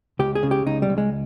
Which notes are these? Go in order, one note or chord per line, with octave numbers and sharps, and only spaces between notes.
C#2 G4
G#4
C#3
G4
C#2 D#4
G3
C#2
G#3